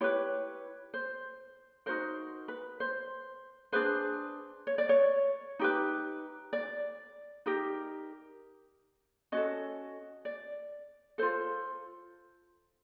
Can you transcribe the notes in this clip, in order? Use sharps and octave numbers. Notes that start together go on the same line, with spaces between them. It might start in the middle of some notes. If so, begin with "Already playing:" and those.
E4 G4 B4 C#5
C5
D#4 F#4 A#4 C5
B4
C5
D4 F4 G#4 B4 C5
C#5
D5
C#5
D#4 G4 B4
D5
D#4 G4 A#4
C#4 F#4 A4 D#5
D5
F4 A4 C5